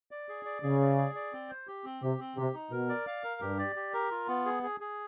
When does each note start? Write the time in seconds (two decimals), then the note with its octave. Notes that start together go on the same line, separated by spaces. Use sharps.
0.11 D5
0.29 G#4
0.45 D5
0.63 C#3 G#4
0.81 D5
0.97 G#4
1.15 D5
1.33 C4
1.49 C5
1.67 G4
1.84 C4
2.02 C3 G4
2.19 C4
2.37 C3 G4
2.54 D#4
2.71 B2 A#4
2.89 D5
3.07 F5
3.24 A#4
3.41 G2 G4
3.59 D5
3.76 G4
3.94 A#4
4.11 F4
4.28 B3
4.46 G#4
4.63 G#4
4.80 G#4